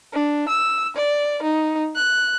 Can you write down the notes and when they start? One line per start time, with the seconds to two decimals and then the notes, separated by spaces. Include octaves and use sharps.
0.13 D4
0.49 E6
0.96 D5
1.43 D#4
1.96 F#6